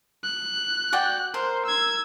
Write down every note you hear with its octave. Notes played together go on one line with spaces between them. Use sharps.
F#6
F#4 D5 G5
A#4 C5
E6 G#6